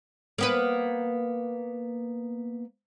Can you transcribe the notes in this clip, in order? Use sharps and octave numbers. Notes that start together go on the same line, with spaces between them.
A#3 B3 B4